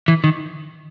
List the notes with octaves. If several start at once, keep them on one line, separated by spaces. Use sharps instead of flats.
E3
D#3